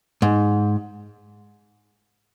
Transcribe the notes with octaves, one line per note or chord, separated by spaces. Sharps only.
G#2